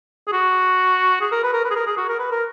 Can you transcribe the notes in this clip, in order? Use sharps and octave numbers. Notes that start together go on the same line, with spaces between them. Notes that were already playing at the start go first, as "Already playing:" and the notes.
G#4
F#4
G#4
A#4
B4
A#4
B4
G#4
A#4
G#4
F#4
A#4
B4
A#4